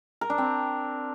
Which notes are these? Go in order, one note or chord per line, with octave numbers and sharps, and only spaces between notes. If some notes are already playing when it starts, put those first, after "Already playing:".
A#4
D4
C4